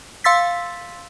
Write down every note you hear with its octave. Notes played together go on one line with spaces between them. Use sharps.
F5 C6 E6 A6 B6